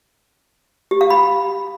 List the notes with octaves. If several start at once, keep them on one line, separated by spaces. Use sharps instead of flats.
G4
F5
B5